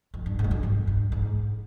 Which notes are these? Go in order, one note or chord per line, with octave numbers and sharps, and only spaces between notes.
F2
G2
G#2
G2
F2
G2
G2
G#2